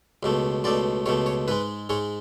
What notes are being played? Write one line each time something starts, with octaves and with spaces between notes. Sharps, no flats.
C#2 B2 A3
C#2 B2 A3 D5
C#2 B2 A3 C#5
C#5
G#2 G#3 B4
G#2 G#3 C#5